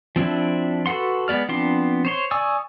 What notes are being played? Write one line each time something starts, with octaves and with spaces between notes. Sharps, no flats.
F3 C4 D4 E4
F#4 A4 B4 F#5 C6
G#3 B3 D5 F6
F3 B3 C4 D4 C6
C5 C#5 C6
D5 G#5 C#6 D#6 E6